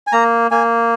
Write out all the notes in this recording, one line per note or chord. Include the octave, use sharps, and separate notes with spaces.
G#5
A#3 A#5
A#3 G#5